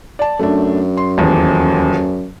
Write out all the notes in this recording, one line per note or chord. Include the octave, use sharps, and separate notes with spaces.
D5 A5
F#2 A3 D4
C6
D#1 E2